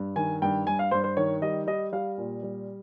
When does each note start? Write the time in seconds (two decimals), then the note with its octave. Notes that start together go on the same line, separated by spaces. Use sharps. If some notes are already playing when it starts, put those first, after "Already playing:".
Already playing: G2
0.16 D#3 G#5
0.42 G2 G5
0.66 G2 G#5
0.79 F5
0.91 G2 C5
1.04 C5
1.17 D#3 C#5
1.42 G3 D#5
1.67 G3 D#5
1.92 G3 F5
2.18 A#2
2.43 G3